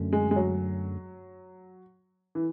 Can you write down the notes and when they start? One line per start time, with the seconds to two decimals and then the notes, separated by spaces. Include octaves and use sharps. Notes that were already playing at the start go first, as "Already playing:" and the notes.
Already playing: F#2 D3 A3 C#4
0.13 G#3
0.31 G#3
0.36 F#3
2.35 E3